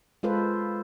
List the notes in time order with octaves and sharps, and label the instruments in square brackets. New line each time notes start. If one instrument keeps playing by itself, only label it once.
[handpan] G#3 F4 A4 B4 C5